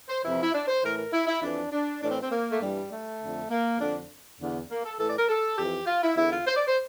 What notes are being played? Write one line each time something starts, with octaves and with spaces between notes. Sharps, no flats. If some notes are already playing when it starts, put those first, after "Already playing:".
C5
F2 C3 E3 E4
E4
D4
C5
A2 E3 A#4
A#4
E4
E4
F2 E3 D4
D4
A2 E3 D4
C4
C4
A#3
A3
G2 E3 G3
A3
F2 D3
A#3
F2 D3 D4
E2 D3
A#3
A4
A2 E3 A4
D5
A#4
A4
F2 E3 G4
F4
E4
E2 D3 E4
F4
C5
D5
C5